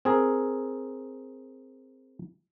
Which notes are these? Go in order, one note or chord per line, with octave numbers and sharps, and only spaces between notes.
C4 G#4 A#4